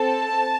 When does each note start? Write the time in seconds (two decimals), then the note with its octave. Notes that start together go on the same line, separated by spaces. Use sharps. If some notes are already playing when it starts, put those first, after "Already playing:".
Already playing: C4 A4 A5